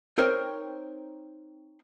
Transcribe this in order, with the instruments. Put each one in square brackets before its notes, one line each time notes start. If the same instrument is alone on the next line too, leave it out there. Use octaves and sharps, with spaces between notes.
[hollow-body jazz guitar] C4 D#4 A#4 C5 C#5 G5